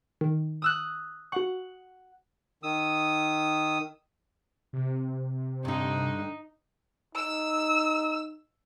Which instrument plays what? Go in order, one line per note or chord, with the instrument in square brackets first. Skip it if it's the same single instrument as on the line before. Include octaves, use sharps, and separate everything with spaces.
[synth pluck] D#3
[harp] D#6 E6 F#6
[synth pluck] F#4 C#6 [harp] F#5
[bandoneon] D#3 D#6 E6
[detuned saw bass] C3
[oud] G2 D3 [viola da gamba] D#4
[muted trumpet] D#4 [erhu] E6